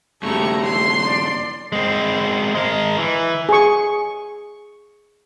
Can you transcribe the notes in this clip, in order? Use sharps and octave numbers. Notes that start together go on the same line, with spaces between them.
G2 C#3 A3 G4 A#5 C#6
C6
D5
G#3 C4
G#3 A#4
E3
G#4 C#6